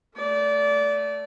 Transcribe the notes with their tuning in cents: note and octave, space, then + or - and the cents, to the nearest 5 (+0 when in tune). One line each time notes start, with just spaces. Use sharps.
A3 +0 D5 -25